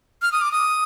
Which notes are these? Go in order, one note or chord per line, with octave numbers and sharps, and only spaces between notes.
F6
D#6
D6
D#6